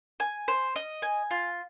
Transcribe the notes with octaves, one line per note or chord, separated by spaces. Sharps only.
G#5
C5
D#5
G#5
F4